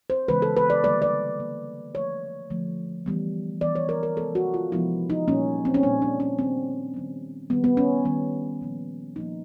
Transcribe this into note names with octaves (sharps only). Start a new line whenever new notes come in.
C5
C#3 E3 G#3 B3 B4
A4
B4
D5
D3 G3 A#3 D5
D5
D3 G3 A#3
D3 F3 A3 C#5
D3 F3 A3
E3 G3 B3
E3 G3 B3 D5
C#5
A#4
A#4
C3 F3 G#3 B3 A4
F#4
F4
C3 F3 G#3 B3 E4
D#4
A#2 G3 A#3 C#4
C4
C#4
A#2 G3 A#3 D4
D4
C#4
D#3 G3 B3 C4
D#3 G3 B3
D#3 G3 B3
B3
C#4
D#3 G3 B3
A#2 F3 A#3
A#2 F3 A#3 D#4